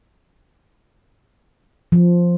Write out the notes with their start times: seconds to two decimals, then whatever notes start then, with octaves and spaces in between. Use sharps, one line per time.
1.92 F3